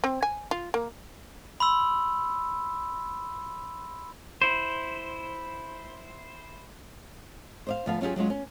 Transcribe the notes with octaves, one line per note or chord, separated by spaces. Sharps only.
C4
G#5
F4
A#3
B5 C6 E6
E4 C5
C5 D5 F5
D2 F3 B3 F5
F#3 C#4 F4 G4 G#4
F#3 G#3 C#4 F4
C#4